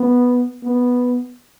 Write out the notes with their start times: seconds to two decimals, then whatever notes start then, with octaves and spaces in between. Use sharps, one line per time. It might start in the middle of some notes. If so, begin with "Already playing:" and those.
Already playing: B3
0.63 B3